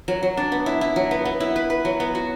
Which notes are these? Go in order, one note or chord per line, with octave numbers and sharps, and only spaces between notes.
F#3
F#3
D4
B3
E4
E4
F#3
B3
B3
E4
B4
B4
F#3
B3
F#4